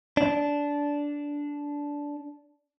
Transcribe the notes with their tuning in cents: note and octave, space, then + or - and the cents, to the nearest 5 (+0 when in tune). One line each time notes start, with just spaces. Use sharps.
D4 -15